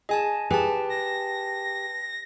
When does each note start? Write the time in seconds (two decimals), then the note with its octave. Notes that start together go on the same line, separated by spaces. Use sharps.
0.09 G#4 D#5 G#5 A5
0.51 G4 G#4 B4 A5
0.90 A#6